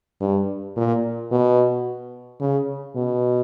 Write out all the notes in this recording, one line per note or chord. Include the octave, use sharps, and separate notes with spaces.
G2
A#2
B2
C#3
B2